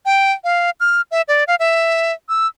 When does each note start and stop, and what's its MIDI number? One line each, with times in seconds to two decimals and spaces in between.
0.06 0.32 79
0.44 0.70 77
0.80 1.01 89
1.11 1.22 76
1.28 1.44 74
1.47 1.55 77
1.60 2.13 76
2.29 2.47 88